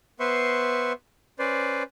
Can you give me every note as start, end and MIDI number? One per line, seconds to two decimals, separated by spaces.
0.20 0.93 59
0.20 0.93 71
0.20 0.93 72
0.20 0.93 76
0.20 0.93 84
0.20 0.93 85
1.39 1.83 61
1.39 1.83 71
1.39 1.83 72
1.39 1.83 74